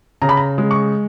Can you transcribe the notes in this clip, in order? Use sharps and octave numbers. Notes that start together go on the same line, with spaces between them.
C#3 A#5
B5
A#5
G#3
C#6